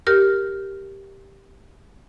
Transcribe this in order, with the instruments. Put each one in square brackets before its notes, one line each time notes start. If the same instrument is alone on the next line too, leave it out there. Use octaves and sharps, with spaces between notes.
[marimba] G4 A#4 F6